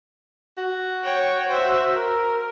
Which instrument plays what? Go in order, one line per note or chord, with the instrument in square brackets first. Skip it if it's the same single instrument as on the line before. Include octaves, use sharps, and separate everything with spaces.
[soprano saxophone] F#4
[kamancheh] C#5 G5
C5 E5
A#4